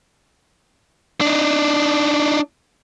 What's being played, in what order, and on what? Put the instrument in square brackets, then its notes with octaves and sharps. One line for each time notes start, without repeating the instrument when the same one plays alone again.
[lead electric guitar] D4 D#4